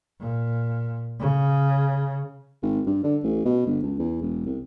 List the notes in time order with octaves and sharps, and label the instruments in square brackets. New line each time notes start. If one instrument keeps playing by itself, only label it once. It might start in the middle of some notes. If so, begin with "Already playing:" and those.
[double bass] A#2
C#3
[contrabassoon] G#1
G2
D3
A1
B2
G1
C#2
E2
E1
C2